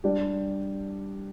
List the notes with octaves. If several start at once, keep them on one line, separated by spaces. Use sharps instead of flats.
G3 D4 G4